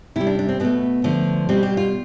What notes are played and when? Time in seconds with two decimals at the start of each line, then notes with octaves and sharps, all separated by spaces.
0.16 C3 G3 E4
0.27 D4
0.39 D4
0.49 C4
0.60 B2 A3 B3
1.04 D3 F3 A3
1.49 B2 G3 C4
1.63 G4
1.77 F4